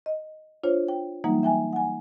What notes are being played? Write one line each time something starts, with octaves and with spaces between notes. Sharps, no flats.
D#5
D4 F4 C5 C#5
G5
E3 F#3 G3 A#3 D#4
E5 G5 G#5
F#5 G#5